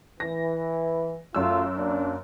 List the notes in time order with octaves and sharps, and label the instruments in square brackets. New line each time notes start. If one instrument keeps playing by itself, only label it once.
[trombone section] E3 [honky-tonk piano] A#6
[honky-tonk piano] F#2 E6 [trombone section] F#3 A3 F4
[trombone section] A#3 C#4 D4